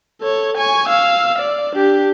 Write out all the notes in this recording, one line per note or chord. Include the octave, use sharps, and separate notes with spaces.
A4 C#5
G#5 C#6
F5 E6
D5
D4 G4